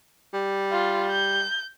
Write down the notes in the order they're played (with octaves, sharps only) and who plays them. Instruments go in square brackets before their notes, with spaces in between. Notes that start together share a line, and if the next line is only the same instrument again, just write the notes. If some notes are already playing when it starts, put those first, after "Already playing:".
[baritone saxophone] G3
[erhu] F4
G6